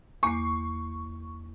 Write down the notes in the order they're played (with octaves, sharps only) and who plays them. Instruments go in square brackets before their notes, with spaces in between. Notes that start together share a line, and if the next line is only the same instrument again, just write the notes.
[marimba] E2 A#3 D6 [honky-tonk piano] C#6 C7